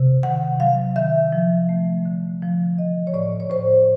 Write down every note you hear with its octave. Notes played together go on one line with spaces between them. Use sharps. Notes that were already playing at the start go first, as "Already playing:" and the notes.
Already playing: C3
D#3 F#5
F#3 F5
D#3 E5
F3
A3
D3
F3
E3 D#5
C#5
A2 D5
C#5
A2 C5